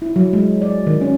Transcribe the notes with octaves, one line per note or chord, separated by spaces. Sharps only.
E4
F#3
G#3
D5
D#3
C#4